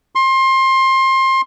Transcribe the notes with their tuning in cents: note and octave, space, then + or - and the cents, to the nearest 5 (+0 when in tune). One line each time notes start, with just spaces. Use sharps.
C6 +25